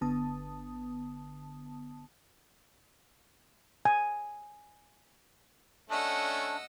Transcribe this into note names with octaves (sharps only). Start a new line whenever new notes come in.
G1 D3 B3 A5 D#6
G#5
A3 C#4 D4 D#5 F#5 E6